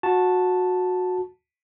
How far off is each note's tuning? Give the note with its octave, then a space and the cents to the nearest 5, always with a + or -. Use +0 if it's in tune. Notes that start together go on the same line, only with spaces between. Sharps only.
F#4 -20 A5 +0